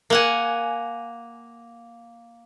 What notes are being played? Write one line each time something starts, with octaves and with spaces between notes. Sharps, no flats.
A#3 F#5 G#5